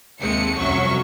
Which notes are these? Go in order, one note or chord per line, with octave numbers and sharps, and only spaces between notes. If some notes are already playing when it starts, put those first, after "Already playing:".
D#2 D#3 G#3 A3 C4 C#7
C2 F2 F#3 C#4 E5 C#6